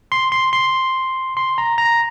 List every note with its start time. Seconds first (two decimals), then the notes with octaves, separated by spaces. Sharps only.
0.12 C6
0.32 C6
0.53 C6
1.37 C6
1.58 A#5
1.78 A#5